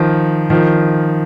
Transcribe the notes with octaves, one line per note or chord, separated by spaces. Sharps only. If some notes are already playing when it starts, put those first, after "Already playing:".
Already playing: D#3 F3
D#3 F3